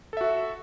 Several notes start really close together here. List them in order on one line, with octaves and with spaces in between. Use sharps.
A4 E5 F#4